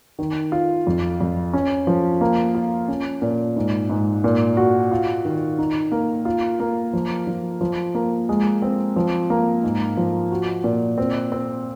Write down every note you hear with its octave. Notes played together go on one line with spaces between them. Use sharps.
D#3
F4
F2
F2
C#4
F3
A#3
F4
C#4
A#2
G#2
G#2
A#2
F#4
F4
D#3
D#4
A#3
F4
A#3
F3
F3
F3
A#3
G#3
C4
F3
A#3
G#2
F3
F#4
A#2
C4
C4